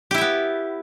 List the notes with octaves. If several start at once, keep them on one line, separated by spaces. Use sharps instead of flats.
B3 E4 G4 E5